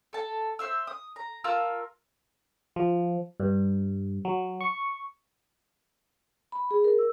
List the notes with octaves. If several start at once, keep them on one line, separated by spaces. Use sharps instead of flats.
A4 A5
C5 E5 E6
D#6
A#5
F4 A#4 A5 E6
F3
G2
F#3
C#6
B5
G#4
A#4
E6